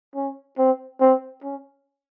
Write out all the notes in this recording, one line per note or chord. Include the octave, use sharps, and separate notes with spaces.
C#4
C4
C4
C#4